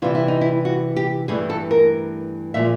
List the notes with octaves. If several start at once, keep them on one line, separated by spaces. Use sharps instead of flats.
C3 E3 G3 F4
E4
D#4
E4
F#4
G4
G2 E3 A3 G#4
A4
A#4
A#2 F3 G#3 E5